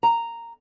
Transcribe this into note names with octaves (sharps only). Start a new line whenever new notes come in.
A#5